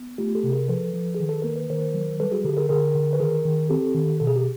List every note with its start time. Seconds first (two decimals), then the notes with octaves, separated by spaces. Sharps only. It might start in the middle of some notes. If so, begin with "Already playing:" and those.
Already playing: B3
0.18 A3 F4 G4
0.35 G4 A4
0.43 C3
0.52 G#4 A#4
0.68 F3 A4 B4
0.94 F3
1.15 G#4
1.20 D#3
1.29 A4
1.42 A#3 A#4
1.56 B4
1.70 D#3 A#4 C5
1.94 F#3
2.20 G3 A4 B4
2.32 F#4 G#4
2.44 D3 G4 A4
2.57 G#4 A#4
2.69 D3 G#4 A#4
2.95 D3
3.13 B4
3.20 D#3 G#4 A#4
3.45 D#3
3.70 C4 G4 A4
3.95 D#3
4.20 B2 A4
4.27 G#4
4.36 G4